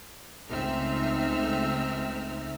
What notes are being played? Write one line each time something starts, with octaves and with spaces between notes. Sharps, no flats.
C#2 A3 C4 D#4 E5 F6